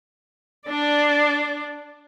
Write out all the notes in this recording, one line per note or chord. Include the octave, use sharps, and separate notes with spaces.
D4 D5